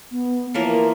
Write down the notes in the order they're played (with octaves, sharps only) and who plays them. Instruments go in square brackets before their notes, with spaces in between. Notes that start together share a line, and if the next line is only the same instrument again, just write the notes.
[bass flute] B3
[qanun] E3 F3 A#3 [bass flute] C#5
[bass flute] A#4